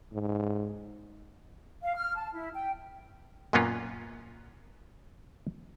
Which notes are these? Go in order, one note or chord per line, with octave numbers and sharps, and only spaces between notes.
G#2
F5
F6
A5
E4
G5
F#2 A#2 A#3 B3 C#4 F4